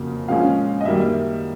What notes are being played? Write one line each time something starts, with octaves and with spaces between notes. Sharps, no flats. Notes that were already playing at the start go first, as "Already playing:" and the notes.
Already playing: F2 C#3 F#3 A#3
A#2 F3 G#3 C#4 F5
D#5
F#2 D#3 G3 A#3 E5